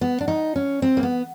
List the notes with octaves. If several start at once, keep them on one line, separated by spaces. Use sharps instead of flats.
B3
D4
D#4
C#4
C4
A#3
B3